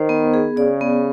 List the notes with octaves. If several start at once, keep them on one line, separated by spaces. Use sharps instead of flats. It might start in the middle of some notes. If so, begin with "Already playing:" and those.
Already playing: D#3 C5
B3
G#4
C#3 D5
B3